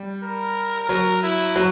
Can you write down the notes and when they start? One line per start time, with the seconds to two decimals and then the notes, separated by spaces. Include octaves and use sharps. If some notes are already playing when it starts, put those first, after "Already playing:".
Already playing: G3
0.23 A#4
0.89 F#3 A#4
1.23 E4
1.56 F#3